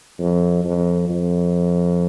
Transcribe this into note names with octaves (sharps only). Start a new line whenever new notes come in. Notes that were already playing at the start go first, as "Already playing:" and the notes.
F2
F2
F2